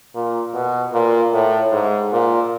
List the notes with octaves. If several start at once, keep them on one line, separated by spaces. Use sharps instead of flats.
A#2
B2
A#2
A2
G#2
A#2